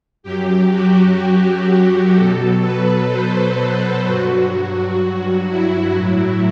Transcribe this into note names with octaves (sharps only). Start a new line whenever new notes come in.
F#2 F#3 G4
F#4
F#4
G4
B2 F#3 A4
B4
C5
B4
G2 F#3 F#4
E4
A2 F#3 E4